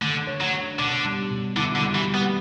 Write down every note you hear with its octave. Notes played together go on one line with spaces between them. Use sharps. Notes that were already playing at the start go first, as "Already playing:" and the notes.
D3 A3
C#5
F#3
D4
B2 D3
G3
B2
D3 E4
D3
G3
E3
G3
B3